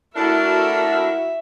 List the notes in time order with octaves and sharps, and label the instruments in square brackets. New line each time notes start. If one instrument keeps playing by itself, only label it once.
[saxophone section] A3 A#4 [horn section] D4 A4 [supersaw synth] E4 F#4 [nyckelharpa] E5